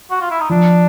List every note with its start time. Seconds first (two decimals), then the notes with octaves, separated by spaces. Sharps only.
0.11 F#4
0.21 F4
0.31 E4
0.40 D#4
0.49 F3 D4